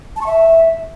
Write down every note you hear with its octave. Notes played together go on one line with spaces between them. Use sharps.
A5
C#6
E5